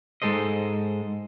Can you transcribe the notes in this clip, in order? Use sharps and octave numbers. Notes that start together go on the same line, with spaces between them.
G#2 F3 G#3 A4 C5 D#5